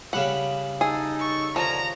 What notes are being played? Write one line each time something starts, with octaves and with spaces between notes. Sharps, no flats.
C#3 G3 F#5 B5
D#4 G#4 A4
C#6
D3 D#3 F3 C#4 A#5